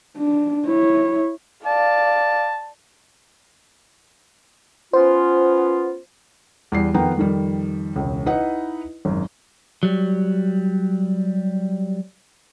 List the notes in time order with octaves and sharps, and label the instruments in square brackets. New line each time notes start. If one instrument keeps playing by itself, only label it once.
[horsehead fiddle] D4
E4 C#5
[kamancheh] D5 F5 [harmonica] A5
[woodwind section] B3 C#4 F4 [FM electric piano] C5
[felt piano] E2 G3 C7
F2 D#3 B3 F#5 G5 A#5
F2 D#3 G3
E1 C#2
D#4 E4 B4 D#5 F#5
G#1 F#2
[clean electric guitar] F#3 G3